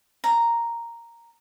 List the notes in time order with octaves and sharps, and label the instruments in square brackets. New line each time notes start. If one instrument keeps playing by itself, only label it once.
[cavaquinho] A#5